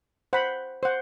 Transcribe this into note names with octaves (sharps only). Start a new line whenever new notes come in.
C5 F#5 B5
C5 F#5